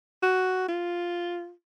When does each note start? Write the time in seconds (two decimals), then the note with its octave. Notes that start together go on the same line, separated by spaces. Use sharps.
0.23 F#4
0.68 F4